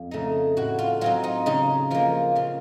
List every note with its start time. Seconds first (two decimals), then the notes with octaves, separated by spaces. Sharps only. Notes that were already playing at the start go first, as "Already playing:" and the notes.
Already playing: F2
0.11 C#3 A3 D#4
0.57 A2 F#4
0.79 F4
1.01 F#3 C4 D#4 F4
1.24 D#4
1.46 C#3 D#4
1.90 F3 A#3 F4
2.36 C#3 F4